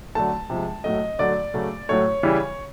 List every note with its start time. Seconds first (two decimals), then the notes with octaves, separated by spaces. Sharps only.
0.15 D3 F#3 A3 A5
0.50 C3 F3 G#3
0.84 A2 F#3 A3 D#5
1.19 D3 F#3 A3 D5
1.54 C#3 F#3 A3
1.89 A2 F#3 A3 C#5
2.23 C#3 E3 G3